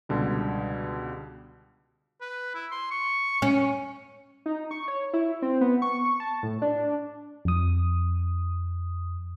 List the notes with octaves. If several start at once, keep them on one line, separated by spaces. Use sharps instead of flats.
C#2 B2 D3 G3
B4
E4
C6
C#6
C#4
D#4
C#6
C#5
E4
C4
B3
C#6
A5
A2
D4
F2 D#6